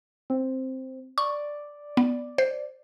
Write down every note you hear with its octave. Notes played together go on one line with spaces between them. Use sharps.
C4
D5 C#6
B3
C5